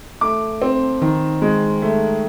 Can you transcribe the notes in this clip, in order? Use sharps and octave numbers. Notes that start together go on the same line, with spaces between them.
A3 D6
C4
D#3
G#3
A3